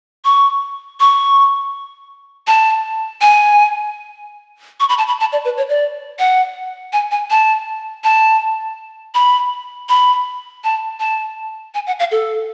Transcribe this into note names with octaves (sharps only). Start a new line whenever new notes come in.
C#6
C#6
A5
G#5
C#6
B5
A5
B5
A5
D5
B4
C#5
D5
F#5
G#5
G#5
A5
A5
B5
B5
A5
A5
G#5
F#5
F5
A4